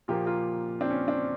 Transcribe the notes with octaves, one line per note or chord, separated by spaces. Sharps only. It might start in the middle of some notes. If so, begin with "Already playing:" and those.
A#2 F3 A#3 F4 G4
F4 G4
C4 D4
C#4
C4 D4